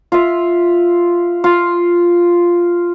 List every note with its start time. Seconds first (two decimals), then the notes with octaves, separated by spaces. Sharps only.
0.12 F4 E5
1.44 F4